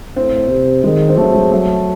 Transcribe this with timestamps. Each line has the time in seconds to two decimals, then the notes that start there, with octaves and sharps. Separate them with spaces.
0.16 A2 C4
0.50 C3
0.84 D#3 G#3
1.09 C4
1.17 F#3 A3
1.34 G#3
1.52 A3